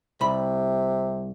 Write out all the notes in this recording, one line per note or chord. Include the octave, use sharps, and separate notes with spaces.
C2 C3 B5